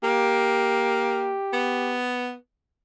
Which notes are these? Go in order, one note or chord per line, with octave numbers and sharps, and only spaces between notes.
A#3 G4
B3